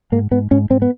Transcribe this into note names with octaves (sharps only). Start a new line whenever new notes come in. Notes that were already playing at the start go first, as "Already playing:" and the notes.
G#2 A#3
G#2 B3
G#2 C#4
G#2 C4
B3